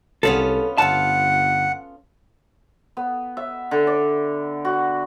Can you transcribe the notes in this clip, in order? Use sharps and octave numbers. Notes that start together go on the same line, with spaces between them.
C2 B3 C#4 F4 G#4 A4
G1 F4 A4 F#5 A5
B3
E5
D3
D5
F#4